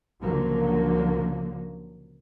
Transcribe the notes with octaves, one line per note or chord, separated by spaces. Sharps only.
C#2 A#2 D3 F3 F#3 A#3